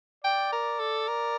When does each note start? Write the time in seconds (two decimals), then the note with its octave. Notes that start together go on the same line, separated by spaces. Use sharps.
0.24 D5 G5
0.52 A#4
0.79 A4
1.08 A#4